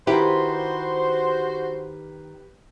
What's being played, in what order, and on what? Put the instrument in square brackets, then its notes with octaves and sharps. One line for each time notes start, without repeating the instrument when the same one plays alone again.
[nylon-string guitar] D#3 E4 [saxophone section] F#4 C5 [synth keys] G4 B4